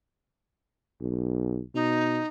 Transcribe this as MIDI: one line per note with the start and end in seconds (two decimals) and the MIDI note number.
1.01 1.62 35
1.74 2.21 47
1.74 2.27 63